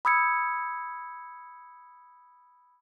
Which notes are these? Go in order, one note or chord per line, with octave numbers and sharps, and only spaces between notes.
B5 D#6 E6 G#6 C#7